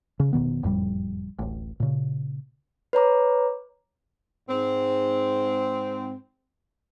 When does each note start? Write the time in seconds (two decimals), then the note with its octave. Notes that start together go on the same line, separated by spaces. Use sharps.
0.20 C#3
0.33 F1 B2 D#3 B3
0.63 F#1 F2 A2 G3
1.39 D1 A1
1.80 A#2 C#3
2.93 B4 C#5 A#5 D6
4.49 G#2 C4